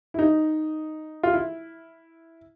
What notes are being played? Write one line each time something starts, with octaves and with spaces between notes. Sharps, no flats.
E4
D#4
F4
E4